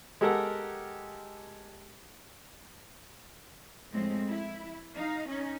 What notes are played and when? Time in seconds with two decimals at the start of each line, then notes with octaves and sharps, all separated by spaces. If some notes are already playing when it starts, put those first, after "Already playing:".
0.21 G#3 G4 A4 A#4 F#5
3.91 A2 F3 G#3 C4
4.29 E4
4.96 D#4 F5
5.28 C#4 D#4